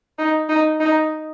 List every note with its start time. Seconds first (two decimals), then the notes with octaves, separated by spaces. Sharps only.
0.19 D#4
0.49 D#4
0.80 D#4